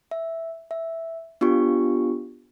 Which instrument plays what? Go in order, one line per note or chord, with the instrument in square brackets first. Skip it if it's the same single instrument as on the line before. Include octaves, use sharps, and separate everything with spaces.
[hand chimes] E5
E5
B3 D4 F4 G4 C#6